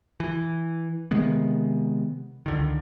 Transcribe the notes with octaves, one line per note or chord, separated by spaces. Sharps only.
E3
C3 D#3 G#3 B3
C#2 D3 D#3